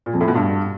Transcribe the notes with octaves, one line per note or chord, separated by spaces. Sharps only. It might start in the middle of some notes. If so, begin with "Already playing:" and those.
A#2
F2
A2
B2
G2